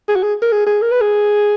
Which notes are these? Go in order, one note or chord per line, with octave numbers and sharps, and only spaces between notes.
G#4
F#4
G#4
A#4
G#4
G#4
A#4
B4
G#4